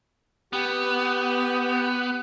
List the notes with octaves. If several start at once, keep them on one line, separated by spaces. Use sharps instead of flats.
B3 G4